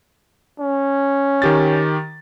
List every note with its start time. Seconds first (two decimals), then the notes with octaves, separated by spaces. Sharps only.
0.60 C#4
1.42 D#3 G4 A6